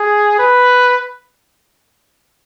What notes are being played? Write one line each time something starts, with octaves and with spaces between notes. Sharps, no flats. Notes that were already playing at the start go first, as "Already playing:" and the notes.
Already playing: G#4
B4